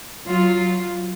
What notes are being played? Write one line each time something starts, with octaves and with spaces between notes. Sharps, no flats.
F#3 F4